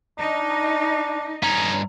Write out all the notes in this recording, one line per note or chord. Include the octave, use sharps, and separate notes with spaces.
D4 D#4
G2 C#4 D#4 A#5